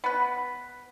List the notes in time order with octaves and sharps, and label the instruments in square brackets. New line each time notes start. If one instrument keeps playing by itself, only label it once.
[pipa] B3 B4